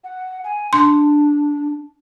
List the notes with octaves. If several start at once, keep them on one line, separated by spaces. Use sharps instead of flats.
F#5
G#5
D4 C6